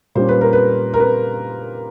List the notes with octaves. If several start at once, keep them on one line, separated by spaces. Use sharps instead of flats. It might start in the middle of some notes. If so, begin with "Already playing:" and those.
A#2 G3 A#3 C#4 C5
B4
A#4
B4
A#4
B4